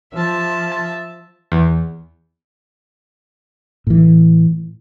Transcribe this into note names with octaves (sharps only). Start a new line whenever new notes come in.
F3 E5 A5
E2
A2 E3